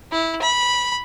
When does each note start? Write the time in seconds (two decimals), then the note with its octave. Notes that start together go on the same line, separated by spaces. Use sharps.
0.12 E4
0.42 B5